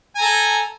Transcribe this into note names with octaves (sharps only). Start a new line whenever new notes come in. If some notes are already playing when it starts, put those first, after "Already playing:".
A4 G#5 A#5